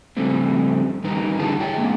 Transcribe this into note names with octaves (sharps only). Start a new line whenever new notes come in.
C#3 F3 G3 A3 C4
D#3 G3 D#4 A#4 B4
F#2 D3 E4 G#4 A5
G#4 C#5 G5
G#3 A#3 C4 C#4